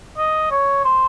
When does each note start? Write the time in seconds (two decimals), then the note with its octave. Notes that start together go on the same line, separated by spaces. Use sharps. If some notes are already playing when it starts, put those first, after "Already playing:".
0.17 D#5
0.51 C#5
0.85 C5